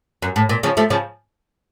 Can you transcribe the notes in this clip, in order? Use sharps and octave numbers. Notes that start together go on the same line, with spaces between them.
F#2
A2
A#2
C#3 F3
F3 A3
C#3 F3